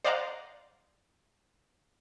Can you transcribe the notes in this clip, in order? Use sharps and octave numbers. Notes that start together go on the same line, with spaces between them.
C5 D5 D#5 F5 F#5 A#5